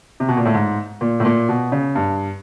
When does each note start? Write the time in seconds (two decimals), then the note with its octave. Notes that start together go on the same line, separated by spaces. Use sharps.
0.20 C3
0.28 B2
0.37 A#2
0.45 A2
0.54 G#2
1.01 A#2
1.20 A2
1.25 A#2
1.49 B2
1.72 C#3
1.95 G2